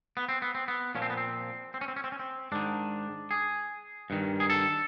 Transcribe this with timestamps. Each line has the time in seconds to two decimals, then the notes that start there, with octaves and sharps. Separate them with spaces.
0.17 B3
0.29 C4
0.42 B3
0.55 C4
0.68 B3
0.95 A#2 F3 C#4
1.02 C4
1.10 B3
1.17 C4
1.74 C4
1.81 C#4
1.88 C4
1.96 C#4
2.04 C4
2.12 C#4
2.20 C4
2.52 G#2 D#3 D4
3.31 G#4
4.10 G2 D#3
4.40 G#4
4.50 A4